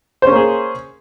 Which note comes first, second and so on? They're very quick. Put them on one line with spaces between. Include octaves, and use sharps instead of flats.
C5 C#4 A#3 G#4